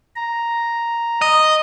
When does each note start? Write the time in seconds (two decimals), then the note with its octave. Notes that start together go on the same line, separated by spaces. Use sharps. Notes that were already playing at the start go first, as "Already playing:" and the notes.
0.16 A#5
1.21 D#5